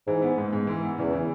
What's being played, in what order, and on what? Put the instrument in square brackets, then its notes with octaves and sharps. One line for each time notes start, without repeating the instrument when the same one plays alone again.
[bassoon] G#2 [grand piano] E3
[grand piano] B3
G#2
G#2
E3
B3
[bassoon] E2 [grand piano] C#3
[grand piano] E3